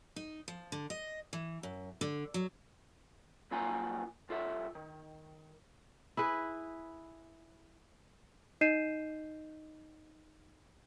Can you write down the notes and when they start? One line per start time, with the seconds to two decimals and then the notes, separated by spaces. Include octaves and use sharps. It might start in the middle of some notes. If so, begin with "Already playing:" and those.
0.16 D#4
0.48 F3
0.72 D3
0.90 D#5
1.33 E3
1.63 F#2
2.01 D3
2.34 F#3
3.51 G2 F#3 A#3 F4 G#5 A#5
4.29 C2 F4 A4 E5
4.75 D#3
6.17 E4 G#4 B4
8.61 D#4 D#5 G6 C7 D#7 E7